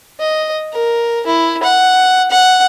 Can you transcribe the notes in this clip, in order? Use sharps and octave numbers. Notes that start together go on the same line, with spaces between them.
D#5
A#4
E4
F#5
F#5